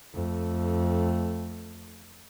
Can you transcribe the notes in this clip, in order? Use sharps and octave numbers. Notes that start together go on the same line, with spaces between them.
F2 A3